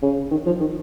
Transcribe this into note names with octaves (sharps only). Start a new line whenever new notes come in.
C#3
D#3
F3
D#3